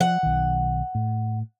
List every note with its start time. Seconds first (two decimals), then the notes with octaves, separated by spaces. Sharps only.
0.01 F3 F#5
0.23 B1 D#3
0.95 A2